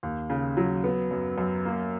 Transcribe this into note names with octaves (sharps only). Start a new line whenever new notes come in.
D#2
C#3
F#3
B3
F#2
F#2
A#3